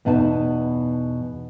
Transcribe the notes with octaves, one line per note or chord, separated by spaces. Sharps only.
E2 B2 D#4 A5